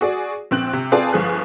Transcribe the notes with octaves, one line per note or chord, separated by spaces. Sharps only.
F#4 G#4 D5
A#1 C4 F#6 F#7
C3
C4 F4 G#4 B4 D5 A5
G1 F3 G#4 F#6